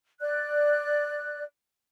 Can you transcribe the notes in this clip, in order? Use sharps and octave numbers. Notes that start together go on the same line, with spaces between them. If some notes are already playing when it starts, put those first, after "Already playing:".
D5 F#6